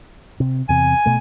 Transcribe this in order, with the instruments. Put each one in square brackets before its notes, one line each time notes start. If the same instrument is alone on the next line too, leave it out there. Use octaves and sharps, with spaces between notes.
[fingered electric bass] C3
[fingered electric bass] E2 C3 [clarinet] G#5
[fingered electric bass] B2 A3